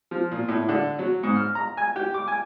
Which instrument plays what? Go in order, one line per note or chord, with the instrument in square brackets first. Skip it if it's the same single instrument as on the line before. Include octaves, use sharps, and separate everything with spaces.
[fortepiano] F3
A#2
A2
D3
F#3
G#2
F6
A#5
G#5
G4
D6
G#5